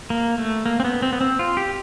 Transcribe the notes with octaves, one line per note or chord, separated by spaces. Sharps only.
A#3
A3
A#3
C4
B3
C4
B3
C4
F4
G4